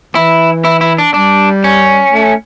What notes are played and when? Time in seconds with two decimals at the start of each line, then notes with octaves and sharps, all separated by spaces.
0.15 E3 E4
0.65 E4
0.81 E4
0.98 D4
1.14 G3 D4
1.64 C#4
2.12 A3